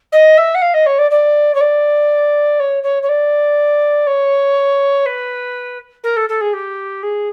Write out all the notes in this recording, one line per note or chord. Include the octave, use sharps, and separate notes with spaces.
D#5
E5
F#5
F5
D#5
C#5
D5
D5
C#5
D5
C#5
C#5
C#5
D5
C#5
B4
A#4
A4
A4
G#4
G4
G#4